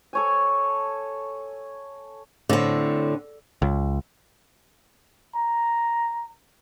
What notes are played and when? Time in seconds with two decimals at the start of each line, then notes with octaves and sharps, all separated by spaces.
0.13 A4 C#5 G#5
2.49 A2 D3 C4
3.62 C#2
5.36 A#5